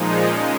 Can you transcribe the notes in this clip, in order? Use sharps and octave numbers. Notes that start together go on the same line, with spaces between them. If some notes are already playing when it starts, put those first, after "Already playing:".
Already playing: A#2 F3 G#3 D#4
C#3 G#3 C#4